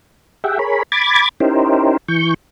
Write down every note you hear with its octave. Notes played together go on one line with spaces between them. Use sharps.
G4 G#4 E5 F#5 G5
G#4 A#4 C#5 B5
B5 D6 G#6 A6
C#4 D#4 E4 G4 A#4 C5
E3 C#6 G6